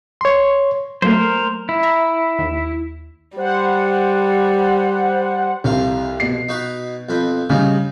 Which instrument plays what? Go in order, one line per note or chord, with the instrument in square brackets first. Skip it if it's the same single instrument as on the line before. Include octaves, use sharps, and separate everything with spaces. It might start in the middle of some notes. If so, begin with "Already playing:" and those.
[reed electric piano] C#5 C6
[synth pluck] F#3 A3 A#3 [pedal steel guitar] A#4 C5
[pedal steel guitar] E4
[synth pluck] E5 A#5
D#2
[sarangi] G3 [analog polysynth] C5 F#5
[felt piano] C2 [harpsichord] F2 C3 F5
[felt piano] B2 C7
[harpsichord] D#4 F#4 B4
F2 C4 B5
[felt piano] C#3 [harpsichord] G3 D#4